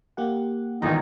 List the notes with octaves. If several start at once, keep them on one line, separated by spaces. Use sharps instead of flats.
A#3 G4 F#5
E1 E2 D#3 D#4 F4 A#5